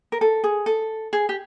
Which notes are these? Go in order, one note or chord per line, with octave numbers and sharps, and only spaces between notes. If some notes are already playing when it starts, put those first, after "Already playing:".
A#4
A4
G#4
A4
G#4
G4